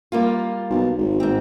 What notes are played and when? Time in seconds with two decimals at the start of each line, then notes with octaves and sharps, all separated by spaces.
0.12 G3 A#3 F4
0.70 B1
0.98 G#1
1.20 G#2 C4